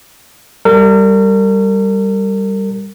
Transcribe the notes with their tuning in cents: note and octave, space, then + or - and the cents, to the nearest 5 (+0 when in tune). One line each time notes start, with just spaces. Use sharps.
G3 +0 A#4 -35